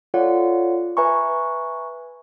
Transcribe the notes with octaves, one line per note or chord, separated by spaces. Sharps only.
F4 A4 C#5 D5 F#5
B4 E5 G#5 A#5 C#6